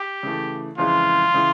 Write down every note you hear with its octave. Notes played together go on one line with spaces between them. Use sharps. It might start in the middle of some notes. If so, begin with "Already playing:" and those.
Already playing: G4
C#3 E3 A3
F2 C#3 E3 G#3 F4
C#3 E3